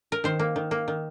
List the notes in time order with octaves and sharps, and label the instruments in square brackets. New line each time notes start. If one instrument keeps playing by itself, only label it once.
[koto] A#4
D#3 C5
A#3
D#3
A#3
D#3